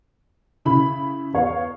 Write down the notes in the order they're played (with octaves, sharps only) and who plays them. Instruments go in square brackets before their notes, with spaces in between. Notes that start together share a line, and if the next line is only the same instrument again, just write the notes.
[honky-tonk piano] C#3 E4 B5
E2 C#5 F5